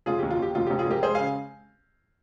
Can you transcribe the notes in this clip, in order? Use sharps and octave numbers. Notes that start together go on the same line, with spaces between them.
F1 F4 G#4
D#2 G4
F4
D#2 G4
F1 F4
F1 G4
F4 G#4
F1 G4 A#4
G#3 G#4 C5
C#3 F5 G#5